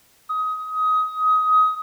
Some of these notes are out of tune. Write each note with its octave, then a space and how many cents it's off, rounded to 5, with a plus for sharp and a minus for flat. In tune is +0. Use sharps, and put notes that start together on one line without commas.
D#6 +20